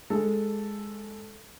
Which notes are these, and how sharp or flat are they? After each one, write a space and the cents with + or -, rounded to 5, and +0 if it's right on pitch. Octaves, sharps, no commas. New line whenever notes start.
G#3 +0 A4 +0